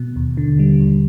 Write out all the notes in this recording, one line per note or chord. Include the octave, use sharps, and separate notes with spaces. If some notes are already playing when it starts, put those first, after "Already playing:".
Already playing: B2
D#2
D3
G3
D#2